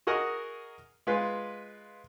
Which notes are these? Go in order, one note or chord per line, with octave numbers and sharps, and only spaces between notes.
F#4 G#4 A#4 D#5 F#5
G#3 F4 B4